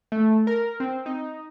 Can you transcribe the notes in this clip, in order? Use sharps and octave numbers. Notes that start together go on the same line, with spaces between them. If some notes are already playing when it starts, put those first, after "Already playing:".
A3
A#4
C4
D#4